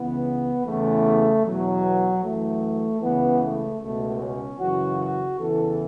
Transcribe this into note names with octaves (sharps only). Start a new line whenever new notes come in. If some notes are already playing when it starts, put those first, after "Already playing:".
Already playing: C#2 C#3 E3 B3
E2 C#3 E3 A3
E2 B2 F#3
F#2 E3 A3
C#2 C#3 E3 B3
A3
C#2 B2 A3
C#4
F#2 C#3 E3 F#4
F#4
E2 C#3 E3 A4